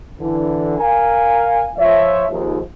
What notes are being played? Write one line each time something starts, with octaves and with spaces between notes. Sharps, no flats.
D3 E3
A#4 F5 G#5
F3 C#5 E5
D#2 G#2 F3